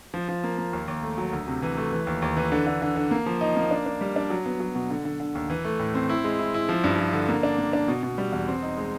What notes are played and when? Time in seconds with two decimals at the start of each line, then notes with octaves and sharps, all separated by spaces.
0.14 F3
0.29 F3
0.44 A#3
0.58 A#3
0.73 D#2
0.88 D#2
1.03 A3
1.18 F#3
1.33 D2
1.48 C3
1.62 E3
1.77 A3
1.92 E3
2.07 D#2
2.22 D#2
2.37 E3
2.52 D3
2.67 D3
2.82 D3
2.96 D3
3.11 A#3
3.26 F3
3.41 D#4
3.56 A#3
3.71 D4
3.86 D4
4.01 G3
4.16 D4
4.30 F#3
4.46 B3
4.60 F#3
4.75 B2
4.90 D3
5.05 D3
5.20 D3
5.35 D#2
5.50 E3
5.65 A3
5.79 A2
5.94 C4
6.09 E4
6.24 G#3
6.39 E4
6.54 E4
6.69 F3
6.84 G2
6.98 F3
7.13 D3
7.29 A#3
7.43 D4
7.58 A#3
7.73 D4
7.88 B2
8.03 B2
8.18 G3
8.32 E2
8.48 C4
8.63 D#4
8.77 G#3